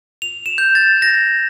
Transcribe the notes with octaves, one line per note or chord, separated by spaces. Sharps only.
F7
E7
G6
A6
A#6